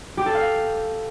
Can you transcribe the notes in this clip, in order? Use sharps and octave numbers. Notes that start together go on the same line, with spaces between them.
G4
A4
F5